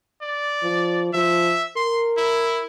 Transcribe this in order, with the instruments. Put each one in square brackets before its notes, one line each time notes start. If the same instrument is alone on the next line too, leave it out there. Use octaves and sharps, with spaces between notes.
[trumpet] D5
[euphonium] F3
[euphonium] F3 [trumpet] E5
[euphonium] A#4 [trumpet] C6
[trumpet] E4